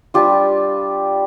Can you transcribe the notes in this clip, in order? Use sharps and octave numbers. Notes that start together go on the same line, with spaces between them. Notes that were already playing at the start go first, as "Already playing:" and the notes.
G3 D4 F4 G4